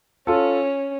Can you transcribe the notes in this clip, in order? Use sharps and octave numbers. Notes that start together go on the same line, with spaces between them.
C#4 F4 A4